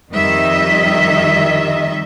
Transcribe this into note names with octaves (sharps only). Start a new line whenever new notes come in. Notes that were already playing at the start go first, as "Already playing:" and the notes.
F2 D#3 G3 D#5 E5